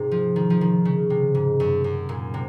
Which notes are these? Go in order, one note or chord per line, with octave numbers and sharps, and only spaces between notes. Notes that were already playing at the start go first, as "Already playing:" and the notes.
Already playing: G#2 C3
F3
D#3
F3
D#3
C#3
C3
G#2
F#2
F#2
A#2
C3